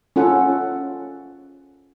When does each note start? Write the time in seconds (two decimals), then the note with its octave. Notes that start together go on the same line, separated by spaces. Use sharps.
0.16 C#4 F4 A4 F#5